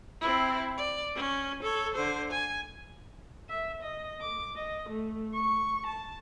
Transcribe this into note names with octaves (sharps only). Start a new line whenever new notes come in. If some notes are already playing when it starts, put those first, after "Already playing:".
C4 E4
D5
C#4
A4 C#5
D3 C5
G#5
E5
D#5
D6
D#5
A3
C#6
A5